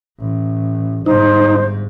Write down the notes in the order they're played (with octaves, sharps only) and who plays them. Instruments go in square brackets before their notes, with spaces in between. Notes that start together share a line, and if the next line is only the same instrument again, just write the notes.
[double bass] A1
[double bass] G1 G#2 [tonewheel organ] D#4 [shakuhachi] C5